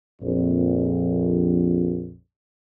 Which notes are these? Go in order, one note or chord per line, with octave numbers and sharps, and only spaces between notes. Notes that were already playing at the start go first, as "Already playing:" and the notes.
A#1 F2